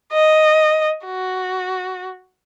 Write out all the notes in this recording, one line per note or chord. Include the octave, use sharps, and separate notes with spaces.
D#5
F#4